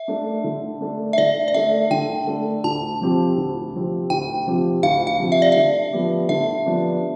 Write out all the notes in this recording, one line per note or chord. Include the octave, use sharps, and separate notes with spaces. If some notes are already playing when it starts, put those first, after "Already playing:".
Already playing: E5
A3 D4
D3
A3 D4
E5
D3 D5
D5
A3 D4 E5
D3 G5
A3 D4
D2 A5
C3 F3 C4 G4
D2
C3 F3 C4 G4
D2 G5
C3 F3 C4 G4
D2 F5
F5
C3 F3 C4 G4
E5
D5
D3 E5
F3 B3 D4 G4
D3 E5
F3 B3 D4 G4